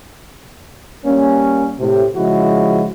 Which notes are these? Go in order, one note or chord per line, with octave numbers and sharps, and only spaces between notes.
G3 A#3 C#4
A2 C3
C#3 F3 G#3 E4 F#4